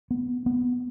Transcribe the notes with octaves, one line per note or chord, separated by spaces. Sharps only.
B3
B3